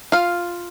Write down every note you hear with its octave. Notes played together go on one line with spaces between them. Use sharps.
F4 F5